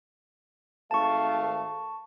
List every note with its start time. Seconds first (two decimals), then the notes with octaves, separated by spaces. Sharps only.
0.91 G#1 A3 F5 A5 C#6